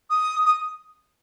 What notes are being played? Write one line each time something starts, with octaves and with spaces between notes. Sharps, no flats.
D#6
D#6